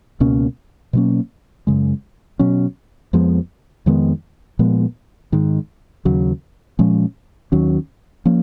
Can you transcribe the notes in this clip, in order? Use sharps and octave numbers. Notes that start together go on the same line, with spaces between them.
C#2 B2 A#3 C#4
B2 F#3 A#3 C#4
F#2 C#3 G#3
B2 F#3 C#4
F2 F3 G#3 B3
F2 D#3 G#3 B3
A#2 F3 G#3 B3
G#2 D#3 G#3
D#2 C#3 F#3
A#2 F3 G#3 C#4
D#2 D#3 F#3 C#4
F3 A#3 C#4